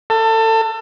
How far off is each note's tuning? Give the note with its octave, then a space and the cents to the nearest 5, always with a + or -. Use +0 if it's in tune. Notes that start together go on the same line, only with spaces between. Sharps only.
A4 +25